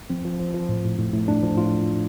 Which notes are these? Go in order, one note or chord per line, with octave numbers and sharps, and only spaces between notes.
F3 C4
F3
F3
F3
A2
A2
A2
A2
A2 D4
F3
A2 F4